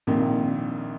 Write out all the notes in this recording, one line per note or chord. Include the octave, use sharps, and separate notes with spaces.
A#1 F2 A#2 D#3 A#3